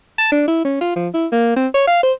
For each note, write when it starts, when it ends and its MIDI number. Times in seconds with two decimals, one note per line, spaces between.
0.18 0.28 81
0.32 0.45 62
0.48 0.63 64
0.65 0.77 61
0.81 0.95 65
0.96 1.08 53
1.14 1.26 64
1.32 1.56 58
1.56 1.67 60
1.74 1.86 73
1.87 1.99 77
2.03 2.12 72